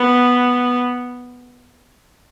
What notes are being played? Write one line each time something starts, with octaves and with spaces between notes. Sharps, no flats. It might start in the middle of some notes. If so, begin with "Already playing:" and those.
Already playing: B3